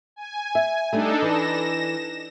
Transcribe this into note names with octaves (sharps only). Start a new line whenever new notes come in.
G#5
E5
G3 A3 D4 D#4 A4
E3 A#6 E7